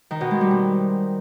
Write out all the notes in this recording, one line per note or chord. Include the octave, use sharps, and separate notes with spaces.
D#3
B2
G#3
G3
C4